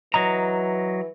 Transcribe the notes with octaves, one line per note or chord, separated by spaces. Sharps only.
E3 F#3 D#5 A#5